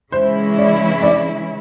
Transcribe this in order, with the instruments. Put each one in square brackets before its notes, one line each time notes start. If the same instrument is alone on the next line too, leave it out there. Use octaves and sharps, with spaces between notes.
[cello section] C#3 E3 G#3 C#4 E4 [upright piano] C5
[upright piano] D5
D5